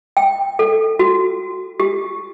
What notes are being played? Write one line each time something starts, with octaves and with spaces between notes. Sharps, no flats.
G5
A4
F#4
G4